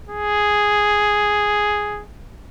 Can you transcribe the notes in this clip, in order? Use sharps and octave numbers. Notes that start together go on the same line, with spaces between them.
G#4